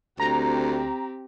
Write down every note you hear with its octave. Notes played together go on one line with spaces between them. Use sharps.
D2 C4 G4 A#5